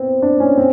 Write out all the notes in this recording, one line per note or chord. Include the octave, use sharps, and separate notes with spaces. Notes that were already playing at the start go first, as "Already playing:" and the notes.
Already playing: B3 C4
D4
C#4
C4